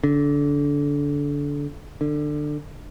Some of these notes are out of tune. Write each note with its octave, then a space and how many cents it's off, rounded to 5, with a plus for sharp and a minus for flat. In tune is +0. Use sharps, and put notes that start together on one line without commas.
D3 -25
D3 +20